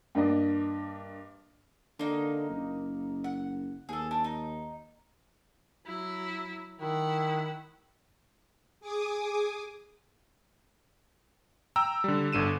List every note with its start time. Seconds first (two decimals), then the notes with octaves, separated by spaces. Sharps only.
0.15 G2 A#3 D4 D#5
1.99 D3 A#3 D#4
2.49 F#1
3.24 F#5
3.89 D#2 G#4 A4
4.11 D4
4.24 D#4
5.87 F#3 E4
6.80 D#3 E4 F#5
8.80 G#4 G#5 D6 D#6
11.76 G5 A#5 E6
12.04 D3 G3
12.32 G1 D3 D#7 E7